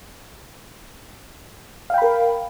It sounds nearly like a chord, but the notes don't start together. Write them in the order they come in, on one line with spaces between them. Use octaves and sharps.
F5 G5 B5 A#4